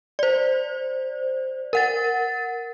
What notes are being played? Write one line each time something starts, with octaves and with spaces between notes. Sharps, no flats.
C5 D5
A#4 F#5 A6